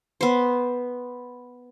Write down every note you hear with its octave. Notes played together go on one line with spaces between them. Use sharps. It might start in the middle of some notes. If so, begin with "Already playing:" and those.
B3 C5